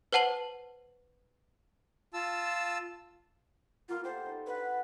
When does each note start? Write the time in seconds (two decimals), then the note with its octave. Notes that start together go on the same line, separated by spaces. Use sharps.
0.13 B4 C5 F#5 A5 F#7
2.14 F4 A5 E6
3.89 A#3 B3 F4
4.04 F4 G4 A4 C5
4.26 D#4 A4
4.47 D4 B4 F#5